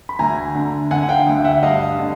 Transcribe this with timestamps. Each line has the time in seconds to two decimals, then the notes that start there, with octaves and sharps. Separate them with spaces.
0.09 B5
0.19 D2 G#5 A#5
0.55 D3
0.91 D3 F#5 G#5
1.03 F#5
1.09 F5 G5
1.26 D2
1.44 E5 F#5
1.63 G2 D#5 F5
1.99 D3